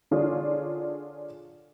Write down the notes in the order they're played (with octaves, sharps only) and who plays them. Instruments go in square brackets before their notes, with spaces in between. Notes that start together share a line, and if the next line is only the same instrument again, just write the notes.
[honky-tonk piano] D3 D4 F4 G#4 C#5